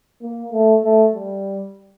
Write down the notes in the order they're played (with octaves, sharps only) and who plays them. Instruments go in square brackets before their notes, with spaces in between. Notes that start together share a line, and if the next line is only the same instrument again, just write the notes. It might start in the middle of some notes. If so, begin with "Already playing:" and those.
[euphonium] A#3
A3
A3
G3